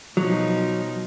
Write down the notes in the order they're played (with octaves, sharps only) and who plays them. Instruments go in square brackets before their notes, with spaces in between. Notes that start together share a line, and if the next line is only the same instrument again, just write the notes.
[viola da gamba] B2 F3 D#4 [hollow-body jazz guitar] F#3